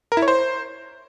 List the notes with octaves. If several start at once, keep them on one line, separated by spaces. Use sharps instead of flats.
A#4
E4
C#5
C5